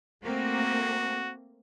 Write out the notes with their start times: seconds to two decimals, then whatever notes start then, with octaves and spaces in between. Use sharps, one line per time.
0.24 A3 A#3 C4 F#4